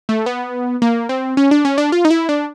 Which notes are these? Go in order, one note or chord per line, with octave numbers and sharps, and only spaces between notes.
A3
B3
A#3
C4
C#4
D4
C#4
D4
F4
D#4
E4
D4